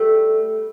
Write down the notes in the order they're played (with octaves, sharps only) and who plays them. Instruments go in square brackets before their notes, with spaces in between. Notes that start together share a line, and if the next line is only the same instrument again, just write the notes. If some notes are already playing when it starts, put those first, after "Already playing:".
Already playing: [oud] G3 A3